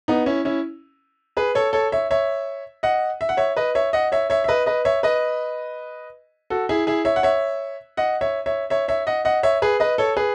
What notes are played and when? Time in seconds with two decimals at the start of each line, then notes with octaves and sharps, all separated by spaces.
0.08 B3 D#4
0.26 C#4 E4
0.45 C#4 E4
1.37 G#4 B4
1.55 A4 C#5
1.73 A4 C#5
1.92 C#5 E5
2.11 C#5 E5
2.83 D#5 F#5
3.21 E5
3.29 F#5
3.37 C#5 E5
3.57 B4 D#5
3.75 C#5 E5
3.93 D#5 F#5
4.12 C#5 E5
4.30 C#5 E5
4.44 E5
4.48 B4 D#5
4.66 B4 D#5
4.85 C#5 E5
5.03 B4 D#5
6.50 F#4 A4
6.69 E4 G#4
6.87 E4 G#4
7.05 C#5 E5
7.16 F#5
7.23 C#5 E5
7.97 D#5 F#5
8.21 C#5 E5
8.46 C#5 E5
8.70 C#5 E5
8.88 C#5 E5
9.07 D#5 F#5
9.25 D#5 F#5
9.43 C#5 E5
9.62 G#4 B4
9.80 B4 D#5
9.98 A4 C#5
10.17 G#4 B4